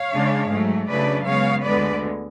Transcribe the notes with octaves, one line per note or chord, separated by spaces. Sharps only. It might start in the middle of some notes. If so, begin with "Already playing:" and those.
Already playing: C#5 F5
C#3 G#3 D4
G#2 F#3 A3
C#3 F#3 A3 D4 B4 D5
C#3 G#3 B3 C#5 F5
D2 D3 G#3 B3 B4 D5